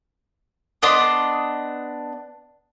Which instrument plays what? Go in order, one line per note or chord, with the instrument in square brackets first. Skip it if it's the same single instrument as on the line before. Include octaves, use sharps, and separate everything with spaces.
[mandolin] B3 D4 D#5 C6